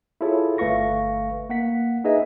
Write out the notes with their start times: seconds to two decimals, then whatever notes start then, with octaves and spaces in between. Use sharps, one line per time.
0.21 E4 F4 G#4 A4 C#5
0.58 G1 A3 B4 F5 C#6 A#6
1.50 A#3 F#5 B6
2.04 D#4 G#4 B4 D#5 E5